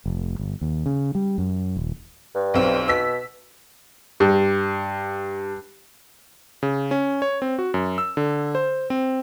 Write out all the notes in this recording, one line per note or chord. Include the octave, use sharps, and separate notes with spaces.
F1
G1
D#2
C#3
G3
F#2
D#1
G2
B1 C4
B2 E6 B6
G2
C#3
C#4
C#5
C4
F#4
F#2
E6
D3
C5
C4